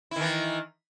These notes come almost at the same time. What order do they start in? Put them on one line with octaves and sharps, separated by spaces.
E4 D#3 E3